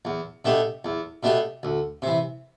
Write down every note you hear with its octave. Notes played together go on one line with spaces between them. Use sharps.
E2
B2 A3 D4 G4
E2
B2 A3 D4 G4
D2
C3 E3